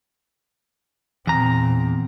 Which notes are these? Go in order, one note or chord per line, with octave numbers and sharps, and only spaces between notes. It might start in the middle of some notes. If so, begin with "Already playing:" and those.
E2 A#2 C4 A#5